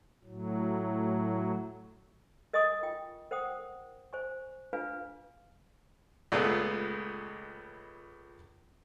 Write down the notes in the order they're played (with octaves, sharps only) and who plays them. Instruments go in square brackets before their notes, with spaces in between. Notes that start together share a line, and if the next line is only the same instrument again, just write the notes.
[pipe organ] A2 F#3
[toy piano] A#4 D#5 G#5 C#6 D#6
F4 G5
A#4 C5 F#5 G5 D#6
C5 G#5 C#6
D4 F4 B4 F5 G#5
[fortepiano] C#2 A#2 G#3 A3 B3 F5